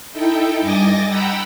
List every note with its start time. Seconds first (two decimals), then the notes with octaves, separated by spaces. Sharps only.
0.12 D#4 E4 A4 G5
0.61 G2 D#5 G#5 D6 A6 A#6
1.09 F#5 G5 A#5 B5 E6